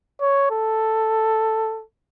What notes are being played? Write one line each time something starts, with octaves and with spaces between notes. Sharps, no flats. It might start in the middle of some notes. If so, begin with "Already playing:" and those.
C#5
A4